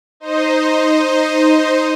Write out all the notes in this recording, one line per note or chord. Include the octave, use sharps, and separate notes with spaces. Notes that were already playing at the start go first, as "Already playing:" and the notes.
D#4 C5 D#5